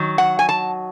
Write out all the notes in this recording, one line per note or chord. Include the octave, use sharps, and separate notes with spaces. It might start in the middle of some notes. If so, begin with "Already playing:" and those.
Already playing: D#3 F#3
F#5
G#5
A5